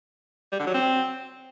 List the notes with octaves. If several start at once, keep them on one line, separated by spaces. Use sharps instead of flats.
G3
D3
F#3
C4